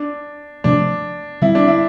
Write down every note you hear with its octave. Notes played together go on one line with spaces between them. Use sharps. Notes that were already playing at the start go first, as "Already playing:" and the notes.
Already playing: D4
C3 F3 A3 D4
D3 G3 C4 E4
D4
E4